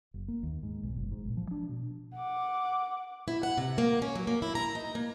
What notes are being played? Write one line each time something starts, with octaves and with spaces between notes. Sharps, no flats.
F#1
A#3
D#2
G#2
B1
F#1
G#2
A#1
F3
D4
B2
F#5 D6
E4
F#5
C3
A#3
C#4
F#3
A#3
E4
A#5
D#4
A#3